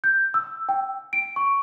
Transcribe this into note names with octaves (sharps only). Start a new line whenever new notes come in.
G6
E6
G5
D7
C#6